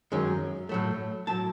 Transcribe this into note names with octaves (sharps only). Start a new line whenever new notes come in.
F#2 D#3 G#3 C#4
A2 F#3 A3
A2 F#3 A3 A5